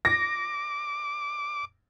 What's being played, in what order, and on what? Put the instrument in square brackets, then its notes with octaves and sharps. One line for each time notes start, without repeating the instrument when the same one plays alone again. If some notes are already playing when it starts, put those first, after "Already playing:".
[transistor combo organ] D6 [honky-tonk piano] A#6